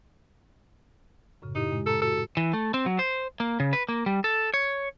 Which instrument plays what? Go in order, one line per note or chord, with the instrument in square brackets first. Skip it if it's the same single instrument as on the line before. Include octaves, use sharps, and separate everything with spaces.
[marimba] F#2 A2 C#3
[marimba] A#2 E4 G4 [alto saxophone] D#4
[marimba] G#3
[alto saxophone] A4 [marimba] A#5
[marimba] F#4 [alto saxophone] A4
[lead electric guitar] E3
A3
C4
F#3
C5
A#3
C#3
B4
A#3
G3
A4
C#5